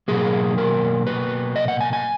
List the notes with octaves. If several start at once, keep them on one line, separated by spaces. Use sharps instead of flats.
B2 F#3 A#3 G#4
A#4
B4
D#5
F#5
G#5
G#5